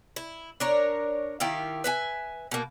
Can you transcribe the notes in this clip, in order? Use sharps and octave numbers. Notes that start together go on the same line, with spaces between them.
E4
D4 A#4 C#5
D#3 E4 G4 F5
B4 E5 G#5
B2 A#3